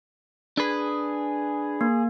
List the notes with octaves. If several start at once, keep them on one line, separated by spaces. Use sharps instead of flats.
D4 G#4 B4
A#3